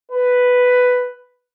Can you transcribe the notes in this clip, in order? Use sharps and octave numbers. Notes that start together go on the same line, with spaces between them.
B4